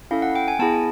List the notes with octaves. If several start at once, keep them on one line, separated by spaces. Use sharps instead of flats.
C#4 E4 A4 F5
F#5
G5
G#5
B3 E4 G#4 A5